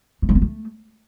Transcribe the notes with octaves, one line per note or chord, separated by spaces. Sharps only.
A3
G#3
B3
A3